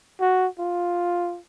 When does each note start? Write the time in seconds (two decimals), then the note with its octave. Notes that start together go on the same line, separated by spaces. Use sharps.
0.20 F#4
0.59 F4